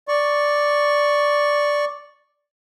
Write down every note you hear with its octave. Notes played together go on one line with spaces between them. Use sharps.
D5 C#6